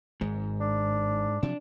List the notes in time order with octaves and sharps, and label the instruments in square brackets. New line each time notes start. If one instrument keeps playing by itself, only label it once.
[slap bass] G#1 [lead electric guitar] G#2
[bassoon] D4
[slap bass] C3 F3 F#3 [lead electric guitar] D4